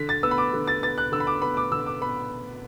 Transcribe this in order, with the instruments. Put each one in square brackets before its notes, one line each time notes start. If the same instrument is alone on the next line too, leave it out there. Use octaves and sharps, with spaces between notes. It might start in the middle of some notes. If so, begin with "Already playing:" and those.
Already playing: [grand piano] D3 B6
A6
B3 E6
B5
D6
D3
A6
B3 A6
F#6
D3 E6
B5
D6
B3 B5
D6
D3 E6
D6
B3 B5